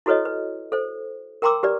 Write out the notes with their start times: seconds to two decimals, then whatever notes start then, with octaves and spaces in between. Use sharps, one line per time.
0.06 E4 F#4 A4 B4 C#5 D#5
0.25 B4
0.72 A4 C5
1.42 A#4 G5 A#5 C6 D6 E6
1.63 G4 B4 D5